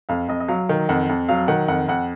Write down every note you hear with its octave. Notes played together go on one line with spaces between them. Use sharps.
F2 F5
F2 D#5
D#5
F#3 F5
D#3
F2 F#5
F2
F#3 F5
D#3 F#5
F2 F#5
F2 F#5